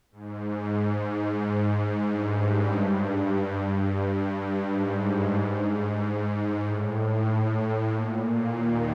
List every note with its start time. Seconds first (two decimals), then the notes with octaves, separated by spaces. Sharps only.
0.12 G#2
0.76 G#2
2.06 G2
2.37 F#2
2.70 G2
4.63 G#2
6.58 A2
7.86 A#2
8.51 D#2 D#3